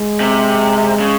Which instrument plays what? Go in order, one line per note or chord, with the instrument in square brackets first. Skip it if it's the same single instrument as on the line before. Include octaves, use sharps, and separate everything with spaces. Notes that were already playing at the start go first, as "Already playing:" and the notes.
Already playing: [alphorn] G#3
[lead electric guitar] C3
C#3